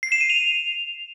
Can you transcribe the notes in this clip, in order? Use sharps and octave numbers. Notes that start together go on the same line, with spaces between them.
C7
E7
D#7
F7